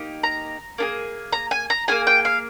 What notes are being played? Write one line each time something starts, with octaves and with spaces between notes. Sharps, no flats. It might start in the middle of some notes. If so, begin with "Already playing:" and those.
Already playing: A#3 D#4 G4
A#5
A#3 D4 G#4
A#5
G#5
A#5
A#3 F4 G#4 G#5
G5
F5